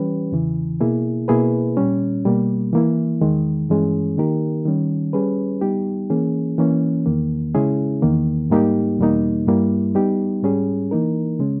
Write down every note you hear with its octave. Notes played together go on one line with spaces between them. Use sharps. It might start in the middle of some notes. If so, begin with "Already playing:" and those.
Already playing: E3 G3 C#4 G4 B4
E2 C#3 E3
B2 A#3 E4 G#4
B2 A#3 E4 G#4 B4
A#2 G3 C#4
B2 G3 A#3
E3 A#3 E4
E2 D#3 G#3
G2 E3 G#3 C#4 G#4
D#3 A#3 D#4 G4 A#4
D#3 G3 C#4
G3 C#4 G#4 B4
G3 B3 D#4 G4
E3 A#3 C#4 G#4
E3 A#3 C#4
E2 D#3 A#3
C#3 G#3 C#4 E4 G#4
E2 D#3 A#3
G#2 G3 A#3 D#4 G4
E2 B2 G3 A#3 D#4
G2 G3 A#3 E4
G3 B3 D#4 G4
G#2 G3 C#4 G#4
E3 A#3 D#4 A#4
C#3 G#3 C#4